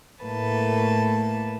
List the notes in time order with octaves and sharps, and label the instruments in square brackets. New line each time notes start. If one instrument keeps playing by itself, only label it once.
[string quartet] A2 A3 A#3 B4 A5